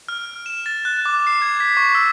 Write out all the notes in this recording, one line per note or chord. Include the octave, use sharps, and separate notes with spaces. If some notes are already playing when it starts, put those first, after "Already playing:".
F6
E7
A6
F#6
D6
C7
G#6
B6
C#6
E6